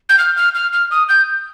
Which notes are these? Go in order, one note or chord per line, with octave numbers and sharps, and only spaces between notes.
G6
F6
F6
F6
F6
D#6
G6